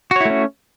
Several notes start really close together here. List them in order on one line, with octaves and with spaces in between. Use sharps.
F#4 C#5 E4 A3 C#4